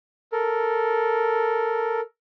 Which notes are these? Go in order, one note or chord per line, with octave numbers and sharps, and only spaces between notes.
A4 A#4